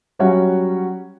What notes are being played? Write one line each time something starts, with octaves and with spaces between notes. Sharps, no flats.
F#3 G3 C#4 F#4 C#5 F#5